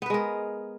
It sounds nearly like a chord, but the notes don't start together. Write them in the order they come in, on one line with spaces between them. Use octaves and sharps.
B3 B4 G#3 A#4